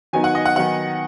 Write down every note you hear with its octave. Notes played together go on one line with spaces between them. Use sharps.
D#3 F#3 B3 D#4 G#5
F#5
D#5
F#5
D#3 F#3 B3 D#4 F#5